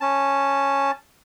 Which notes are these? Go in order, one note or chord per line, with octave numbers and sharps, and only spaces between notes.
C#4 A5